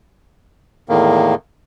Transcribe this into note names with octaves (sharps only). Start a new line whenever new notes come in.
E2 A2 D#3 A#3